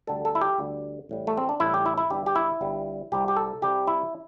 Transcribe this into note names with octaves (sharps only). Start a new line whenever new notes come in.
D2 D3 G3 A4
A4
E4
G4
D2 D3 G3
A1 A2 G3
A3
C4
D4
A1 A2 G3 E4
G4
E4
E4
G1 G2 G3 G4
G4
E4
G1 G2 G3
C2 C3 G3 G4
G4
A4
C2 C3 G3 G4
E4